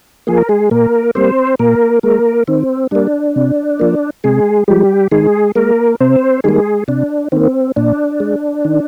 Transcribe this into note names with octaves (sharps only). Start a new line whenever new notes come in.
F3 A#3 G#4
A#4
G#3 G#4
A#2 A#3 A#4
G3 A#3 C4 C5
A#2 A#3 A#4
G#3 A#3 A#4
D#3 C4
G3 A#3 D4
C3
F3 A#3
C3 G#3 G#4
F3 G3 G#3 G4
D#3 G#3 G#4
G#3 A#3 A#4
C3 C4 C5
D#3 G3 G#3 A#3 G#4
C3 D4
D#3 A#3 C4
A#2 D4
G#3
D#3